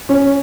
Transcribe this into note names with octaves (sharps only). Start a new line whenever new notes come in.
C#4